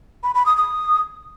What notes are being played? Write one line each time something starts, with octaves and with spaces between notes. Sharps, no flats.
B5
B5
D#6
D#6